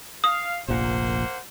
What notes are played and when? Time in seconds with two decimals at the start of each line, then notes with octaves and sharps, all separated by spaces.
0.24 F5 D#6
0.68 F1 A#1 A#2 A#3 C5 F#5